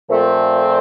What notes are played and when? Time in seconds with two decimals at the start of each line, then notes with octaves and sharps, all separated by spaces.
0.08 A#2 F3 A3 C4